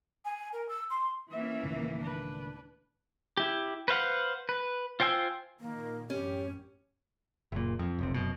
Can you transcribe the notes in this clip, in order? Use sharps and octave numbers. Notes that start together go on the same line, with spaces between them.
G#5
A#4
E6
C6
E3 A#3 C#4 E5
C#2 A2 D#3
D4 B4
E4 G4
B4 C5 F5 F#5
B4
F4 C5 G5 G#5 E6
A#2 D#3 A#3
A1 F#2 C#4 G4
F#1 A#2
F2
F1 B1 C3
F1 F#2 B2